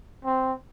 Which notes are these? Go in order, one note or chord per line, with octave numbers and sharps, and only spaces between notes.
C4